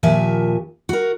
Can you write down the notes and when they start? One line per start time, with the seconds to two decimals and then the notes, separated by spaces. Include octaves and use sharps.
0.03 D#2 A#2 F3 E5 G#5
0.89 F#4 A#4